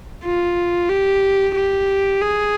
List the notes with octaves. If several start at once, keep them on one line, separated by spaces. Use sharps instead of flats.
F4
G4
G4
G#4